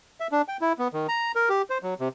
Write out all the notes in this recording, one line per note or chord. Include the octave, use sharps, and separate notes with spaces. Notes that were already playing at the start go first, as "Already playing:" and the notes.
E5
D4
G5
E4
B3
D#3
A#5
A#4
G4
C5
F#3
C3